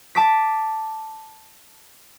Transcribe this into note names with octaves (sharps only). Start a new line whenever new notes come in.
A5 D6 B6